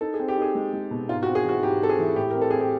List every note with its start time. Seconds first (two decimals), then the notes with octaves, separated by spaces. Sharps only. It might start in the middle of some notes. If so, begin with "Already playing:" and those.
0.01 D#4 A4
0.14 G#4
0.19 C4
0.28 G4
0.37 D#4 G#4
0.55 G#3
0.73 G#3
0.91 B2
1.09 G#2 F4
1.23 F#4
1.26 C4
1.35 G#4
1.44 E3 F#4
1.63 G#2 G4
1.81 C4 A4
1.89 G#4
1.99 E3
2.16 A2 G4
2.31 C4 A#4
2.41 A4
2.50 C4 G#4
2.60 G4